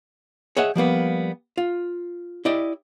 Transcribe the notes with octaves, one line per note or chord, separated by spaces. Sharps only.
G#4 C#5 D#5 E5 F#5 G#5
F3 G3 A#3 B3
F4
E4 G4 D5 D#5